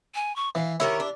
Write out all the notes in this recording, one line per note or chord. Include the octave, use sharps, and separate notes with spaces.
G#5
C#6
E3 F5
D#3 E4 G4 A#4 C#5
D4